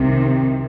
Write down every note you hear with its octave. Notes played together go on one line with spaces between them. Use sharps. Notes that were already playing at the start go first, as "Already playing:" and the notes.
Already playing: C2 C3 D#3